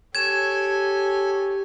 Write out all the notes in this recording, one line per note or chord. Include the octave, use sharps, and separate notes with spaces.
G4 A4 C#5 G#5 G#6 E7